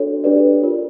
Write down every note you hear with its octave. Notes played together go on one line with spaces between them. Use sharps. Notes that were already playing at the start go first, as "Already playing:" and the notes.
Already playing: D4 F#4 A4 C#5
D4 G4 B4 D5
F4 A#4 C#5